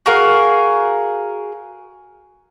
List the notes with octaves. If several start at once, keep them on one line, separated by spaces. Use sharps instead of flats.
F#4 G#4 A#4 F5